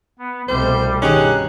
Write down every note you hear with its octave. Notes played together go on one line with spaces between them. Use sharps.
B3
C2 B2 G3 A3 C5
G2 B2 D#3 C#4 D#4 G4 G#4 F#6